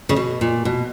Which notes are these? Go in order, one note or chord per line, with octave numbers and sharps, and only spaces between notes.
C#3
B2
A#2
B2